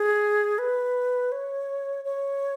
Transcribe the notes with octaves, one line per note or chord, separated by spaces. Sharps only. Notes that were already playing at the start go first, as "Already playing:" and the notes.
Already playing: G#4
B4
C#5
C#5